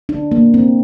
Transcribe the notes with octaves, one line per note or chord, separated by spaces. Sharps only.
D4
A#3
C4